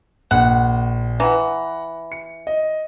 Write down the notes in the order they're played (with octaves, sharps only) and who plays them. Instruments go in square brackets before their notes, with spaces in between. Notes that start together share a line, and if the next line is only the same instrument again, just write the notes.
[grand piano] A#1 [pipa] F#5
[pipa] E3 [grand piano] F#5 A#5
[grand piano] C#7
D#5